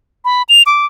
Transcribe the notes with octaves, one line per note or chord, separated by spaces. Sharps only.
B5
F7
D6